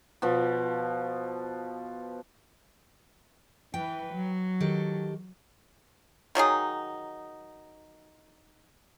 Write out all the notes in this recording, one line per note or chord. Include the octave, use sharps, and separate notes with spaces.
B2 F3
E3 B4 G5
F#3
D#3 G4 A4
D#3 F#3 D#4 G#4